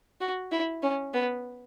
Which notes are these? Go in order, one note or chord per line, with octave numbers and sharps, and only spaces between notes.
F#4
E4
C#4
B3